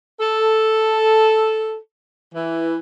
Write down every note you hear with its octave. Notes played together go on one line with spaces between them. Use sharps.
A4
E3